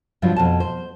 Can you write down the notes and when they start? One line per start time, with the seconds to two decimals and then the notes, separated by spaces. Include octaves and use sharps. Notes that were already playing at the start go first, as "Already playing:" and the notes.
0.22 G2 C3 F3 F#3 E4 F4
0.36 F2 B2 A5
0.60 C5